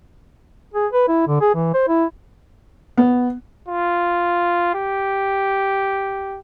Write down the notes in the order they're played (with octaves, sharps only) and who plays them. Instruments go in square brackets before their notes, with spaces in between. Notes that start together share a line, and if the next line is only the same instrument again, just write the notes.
[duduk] G#4
B4
E4
D3
G#4
E3
C5
E4
[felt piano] B3
[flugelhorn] F4
G4